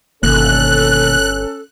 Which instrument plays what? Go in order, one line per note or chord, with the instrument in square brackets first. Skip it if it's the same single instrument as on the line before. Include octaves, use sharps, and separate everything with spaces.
[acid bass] G1 [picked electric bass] B2 D#3 A#3 [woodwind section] C#4 A4 [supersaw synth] F#6